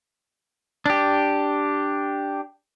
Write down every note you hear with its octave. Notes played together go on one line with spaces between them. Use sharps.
D4 G4